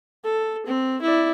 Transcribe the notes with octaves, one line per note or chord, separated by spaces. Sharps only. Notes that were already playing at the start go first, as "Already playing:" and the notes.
A4
C4
E4 D5